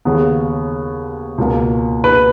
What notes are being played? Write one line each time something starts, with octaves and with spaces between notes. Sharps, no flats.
D#2 C#3 G#3 B3
C#2 B2 A#3
B4